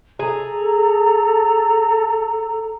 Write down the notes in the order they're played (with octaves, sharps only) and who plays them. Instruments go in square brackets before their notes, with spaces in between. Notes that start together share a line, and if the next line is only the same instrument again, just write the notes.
[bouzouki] G#4 [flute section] A4 A#5